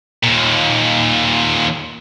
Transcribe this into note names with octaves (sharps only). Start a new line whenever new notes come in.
D#2 A#2